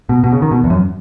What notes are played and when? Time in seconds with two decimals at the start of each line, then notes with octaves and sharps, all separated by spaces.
0.09 B2
0.24 B2
0.32 C#3
0.42 D#3
0.51 B2
0.64 E2
0.70 F#2